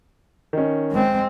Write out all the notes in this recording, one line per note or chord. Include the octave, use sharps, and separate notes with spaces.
D#3 C#4
G#3 C4